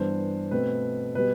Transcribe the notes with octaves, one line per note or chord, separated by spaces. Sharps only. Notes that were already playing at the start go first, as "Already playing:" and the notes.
Already playing: G2 E3 B3 D4 C5
B2 A3 C4 B4
B2 G3 B3 B4